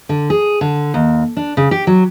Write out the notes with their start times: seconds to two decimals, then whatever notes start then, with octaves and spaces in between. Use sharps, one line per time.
0.09 D3
0.30 G#4
0.61 D3
0.94 D#2
1.37 D4
1.57 C#3
1.71 G4
1.87 F#3